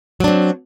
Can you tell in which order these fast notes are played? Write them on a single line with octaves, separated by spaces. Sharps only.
F#3 D4 C4